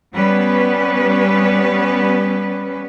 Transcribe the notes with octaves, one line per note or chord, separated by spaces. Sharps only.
G3 B3 C#4 B4